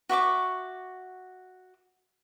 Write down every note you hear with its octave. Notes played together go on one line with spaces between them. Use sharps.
F#4 E5 C#6 D6